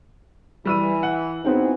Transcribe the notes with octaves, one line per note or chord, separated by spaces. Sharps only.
E3 G3 E6 D#7
F#5
B3 C4 D#4 E4 F#4 G#4